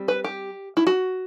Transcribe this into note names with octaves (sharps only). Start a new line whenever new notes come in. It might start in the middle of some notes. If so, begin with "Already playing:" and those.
Already playing: G3 C4
B4
G4
E4
F#4